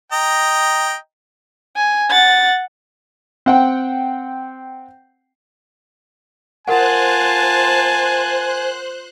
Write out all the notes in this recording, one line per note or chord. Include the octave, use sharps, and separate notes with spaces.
D#5 G5 A#5
G#5
F#5 A6
C4 F#5 G5
F4 A#4 C5 F#5 G#5 A5 F#6